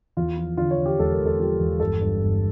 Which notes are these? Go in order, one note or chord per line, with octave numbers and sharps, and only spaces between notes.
E2 F4
F3
D3 F4
C#5
D3
G4
E1 A4
A#4
E1
A4
F3 G4
E2
G1 A4
G2
G1